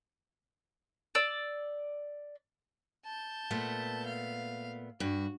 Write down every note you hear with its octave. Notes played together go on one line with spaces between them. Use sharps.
D5 E6
A5 G6
A#2 A3 B3
F5
G2 F#4